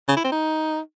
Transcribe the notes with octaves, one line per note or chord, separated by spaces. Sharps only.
C#3
E4
C4
D#4